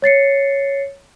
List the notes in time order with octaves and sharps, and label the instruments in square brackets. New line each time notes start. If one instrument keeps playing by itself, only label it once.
[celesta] C#5 A6 C7 C#7